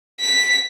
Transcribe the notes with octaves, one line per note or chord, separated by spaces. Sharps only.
B6